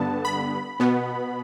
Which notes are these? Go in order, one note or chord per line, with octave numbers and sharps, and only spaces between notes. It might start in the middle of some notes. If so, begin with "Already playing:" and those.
Already playing: G2 D3 B3 A5
B5
B2 B3